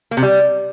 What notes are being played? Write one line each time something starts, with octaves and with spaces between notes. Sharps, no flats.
A#3
C3
G3